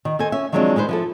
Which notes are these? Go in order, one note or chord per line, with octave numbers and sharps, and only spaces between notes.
D#3
A4 C5 D#5 G#5
C#4 E5
D#3 F3 F#3 G#3 C4 D4
G#3 D#4 B4 C5
F3 E4 A4